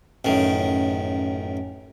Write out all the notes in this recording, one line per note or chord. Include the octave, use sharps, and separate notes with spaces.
A1 F#2 D#3